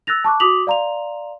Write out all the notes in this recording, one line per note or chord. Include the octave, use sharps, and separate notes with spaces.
E6 F#6 A6 A#6 F7
A5 C#6 D6 F#6
F#4 D6 D#6 B6 F7 F#7
D5 F5 A#5 C6 F7